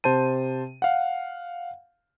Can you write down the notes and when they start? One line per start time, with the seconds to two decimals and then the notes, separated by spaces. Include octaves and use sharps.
0.04 C3 C5 A5 D#7
0.82 F5 F#5